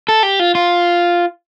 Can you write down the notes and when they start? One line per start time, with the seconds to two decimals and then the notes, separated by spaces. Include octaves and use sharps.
0.08 A4
0.23 G4
0.40 F4
0.55 F4